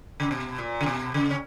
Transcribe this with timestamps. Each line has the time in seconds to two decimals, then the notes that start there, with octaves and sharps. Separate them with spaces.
0.20 C#3
0.31 B2
0.58 A#2
0.81 C#3
0.86 B2
1.14 C#3
1.30 C#4